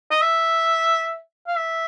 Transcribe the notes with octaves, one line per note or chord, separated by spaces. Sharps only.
D#5
E5
F5
E5